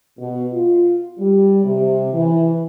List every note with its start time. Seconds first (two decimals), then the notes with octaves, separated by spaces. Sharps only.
0.18 B2
0.53 F4
1.18 G3
1.64 C3
2.13 E3